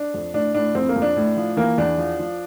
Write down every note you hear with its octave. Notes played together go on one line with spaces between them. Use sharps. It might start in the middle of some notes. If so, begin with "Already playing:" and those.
Already playing: D4
F2
A2 D4
A2 D4
F2 C4
A#3
F2
D4
A2
F3
E3 A#3
E2 D4
F3
F3